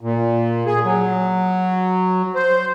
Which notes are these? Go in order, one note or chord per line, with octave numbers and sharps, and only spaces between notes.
A#2
G#4
F#3
C5